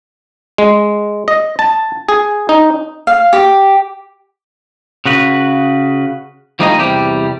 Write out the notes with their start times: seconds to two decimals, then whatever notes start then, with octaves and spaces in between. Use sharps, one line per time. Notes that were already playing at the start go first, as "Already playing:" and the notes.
0.58 G#3
1.28 D#5
1.59 A5
2.09 G#4
2.49 D#4
3.07 F5
3.33 G4
5.06 C#3 F#4 B4
6.59 F3 G3 A3 D#4 G#4 D#5
6.78 E2 C3 G3 G4